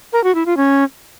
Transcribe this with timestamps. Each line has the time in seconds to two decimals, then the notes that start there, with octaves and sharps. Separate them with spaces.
0.13 A#4
0.24 F#4
0.35 E4
0.46 F4
0.57 C#4